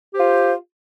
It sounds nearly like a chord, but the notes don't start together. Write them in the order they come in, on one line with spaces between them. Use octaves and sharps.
G4 C5 F4